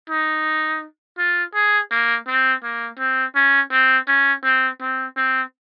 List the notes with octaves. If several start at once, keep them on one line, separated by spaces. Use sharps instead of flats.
D#4
F4
G#4
A#3
C4
A#3
C4
C#4
C4
C#4
C4
C4
C4